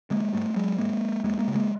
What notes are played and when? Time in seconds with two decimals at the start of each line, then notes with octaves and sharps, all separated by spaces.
0.10 D3 G#3 A#3
0.33 G#2 G3 A3
0.56 F#3 G#3
0.79 G#2 G#3 A#3
1.24 E2 G#3 A#3
1.39 G#3 A#3
1.48 C#3
1.55 G#3 A#3